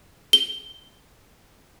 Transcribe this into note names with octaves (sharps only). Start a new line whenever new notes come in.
G7